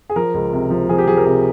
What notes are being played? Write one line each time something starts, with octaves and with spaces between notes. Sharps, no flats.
G#4
F3 A#4
C#2
C3
F3
F3 G#4
G4
F3 G#4
A#4
C3 G#4